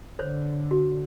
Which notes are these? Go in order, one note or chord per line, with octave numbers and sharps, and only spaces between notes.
D3 C5 C#5
F#4